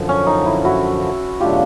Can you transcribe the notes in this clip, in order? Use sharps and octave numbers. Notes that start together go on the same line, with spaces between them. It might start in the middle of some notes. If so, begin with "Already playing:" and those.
Already playing: F#2 D3 F3
C#4
D#4
E4
E4 F#4
E2 B2 F#3 A3 D4 F4 G4